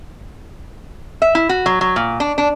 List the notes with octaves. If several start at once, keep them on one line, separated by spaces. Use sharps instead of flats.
E5
E4
F#4
F#3
F#3
A#2
D4
D4